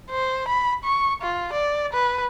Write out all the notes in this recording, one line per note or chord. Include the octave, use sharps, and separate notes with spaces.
C5
B5
C#6
F4
D5
B4